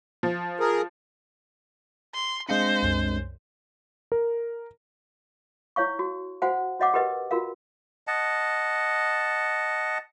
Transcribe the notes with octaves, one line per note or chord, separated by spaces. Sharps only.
F3
G#4 A#4
C6
G#3 C4 D4 C5 F5 A#6 C#7
C2 F#2
A#4
E4 C#5 F5 C#6
F#4
F#4 C5 F5 F#5 G#5
F#4 C#5 D#5 F5 F#5 D6
G4 A#4 B4 D#5 F#5
F4 F#4 A#4 F5
D#5 F#5 A5